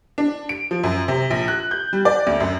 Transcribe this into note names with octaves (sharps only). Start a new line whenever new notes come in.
D4
D7
F3
F#2
C3
A#1
F#6
G6
G3
D5
D2
F#2